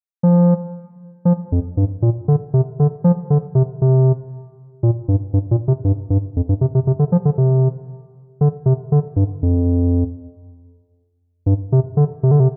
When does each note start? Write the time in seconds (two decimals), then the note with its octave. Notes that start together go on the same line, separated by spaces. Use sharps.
0.23 F3
1.25 F3
1.52 F2
1.77 G2
2.02 A#2
2.28 D3
2.54 C3
2.80 D3
3.04 F3
3.30 D3
3.55 C3
3.82 C3
4.83 A#2
5.08 G2
5.34 G2
5.51 A#2
5.68 C3
5.85 G2
6.10 G2
6.36 F2
6.49 G2
6.61 C3
6.75 C3
6.87 C3
6.99 D3
7.12 F3
7.25 D3
7.38 C3
8.41 D3
8.66 C3
8.92 D3
9.16 G2
9.43 F2
11.46 G2
11.72 C3
11.97 D3
12.23 C3
12.31 D3
12.40 C3